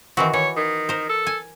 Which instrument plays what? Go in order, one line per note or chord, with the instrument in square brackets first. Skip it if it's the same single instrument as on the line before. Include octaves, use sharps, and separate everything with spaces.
[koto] D#3 E3 F#4 [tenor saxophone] C4
[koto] E3 [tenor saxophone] C#5
[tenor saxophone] D#3
[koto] A#4 C5
[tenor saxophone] A4
[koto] G#5